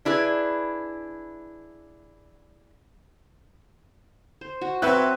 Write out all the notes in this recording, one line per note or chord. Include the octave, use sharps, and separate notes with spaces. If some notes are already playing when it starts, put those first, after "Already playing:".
D4 E4 G#4 B4
C5
F#4
F#3 C4 B4 C#5 E5 F#6